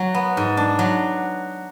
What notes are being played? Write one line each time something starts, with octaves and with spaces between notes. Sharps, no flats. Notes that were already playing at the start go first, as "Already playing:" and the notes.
Already playing: F#3
B3
G#2
D4
F#3